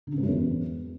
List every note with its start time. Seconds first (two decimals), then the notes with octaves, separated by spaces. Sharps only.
0.07 D3
0.12 C#3
0.18 G#2
0.23 F#2
0.28 E2